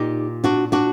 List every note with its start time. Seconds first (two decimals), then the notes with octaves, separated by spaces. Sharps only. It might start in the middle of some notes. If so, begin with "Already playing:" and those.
Already playing: A#2 D#4 G4
0.44 D4 F#4
0.72 D4 F#4